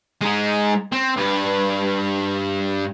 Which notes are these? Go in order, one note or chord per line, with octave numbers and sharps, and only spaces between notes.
G#3 D#4
C4
G2 B4